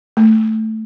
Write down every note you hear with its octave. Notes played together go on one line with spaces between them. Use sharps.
A3